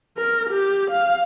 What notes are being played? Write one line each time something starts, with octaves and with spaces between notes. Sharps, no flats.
A#4
G4
F5